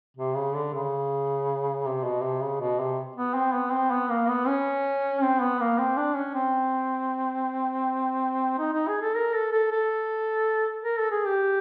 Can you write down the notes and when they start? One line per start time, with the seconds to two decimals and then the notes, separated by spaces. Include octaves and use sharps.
0.17 C3
0.35 C#3
0.55 D3
0.74 C#3
1.85 C3
2.04 B2
2.22 C3
2.42 C#3
2.60 B2
2.79 C3
3.16 B3
3.34 C4
3.54 B3
3.72 C4
3.91 B3
4.10 A#3
4.29 B3
4.48 C#4
5.22 C4
5.41 B3
5.60 A#3
5.78 C4
5.97 D4
6.16 C#4
6.35 C4
8.59 D#4
8.73 D#4
8.88 G#4
9.02 A4
9.15 A#4
9.34 A4
9.52 A4
9.72 A4
10.84 A#4
10.99 A4
11.12 G#4
11.26 G4